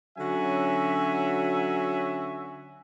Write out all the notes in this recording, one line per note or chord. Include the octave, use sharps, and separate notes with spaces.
D3 F#3 C#4 F#4 E5 G#5